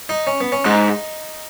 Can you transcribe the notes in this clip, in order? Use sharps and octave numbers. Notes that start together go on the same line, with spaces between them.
D#4
C#4
B3
C#4
G#2 D#4